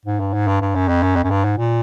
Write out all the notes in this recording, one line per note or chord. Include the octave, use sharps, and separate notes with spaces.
G#2
G2
G#2
G2
G2
F#2
F2
F#2
F2
F#2
G2
G#2
A#2